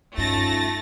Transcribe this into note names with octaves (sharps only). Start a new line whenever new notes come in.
G2 A3 C#4 D#4 F4 A6 A#6